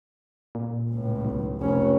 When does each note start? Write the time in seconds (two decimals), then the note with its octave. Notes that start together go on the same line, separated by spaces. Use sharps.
0.55 A#2
0.90 C#2 A2
1.25 B1
1.58 F1 C#4